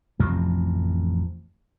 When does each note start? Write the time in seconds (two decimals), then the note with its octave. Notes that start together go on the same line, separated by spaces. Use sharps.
0.19 A1 F2 C3 F3